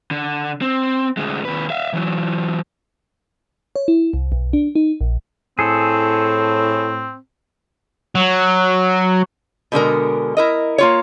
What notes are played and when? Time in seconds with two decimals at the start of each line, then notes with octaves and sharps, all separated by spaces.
0.11 D3
0.62 C4
1.17 D2 G#3
1.45 D#2 B4
1.70 E5 F5
1.93 E3 F#3
3.76 C#5
3.88 E4
4.13 C2
4.32 B1
4.53 D4
4.75 D#4
5.01 A#1
5.59 A2 C4 G#4 A4
8.15 F#3
9.72 B2 D3 G#3 A#4
10.37 E4 A#4 D#5
10.78 A#3 F4 C#5